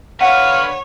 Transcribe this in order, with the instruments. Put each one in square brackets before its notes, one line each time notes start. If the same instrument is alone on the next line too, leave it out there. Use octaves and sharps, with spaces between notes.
[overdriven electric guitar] D3 B4 [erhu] C#5 [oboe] F5 [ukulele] F#5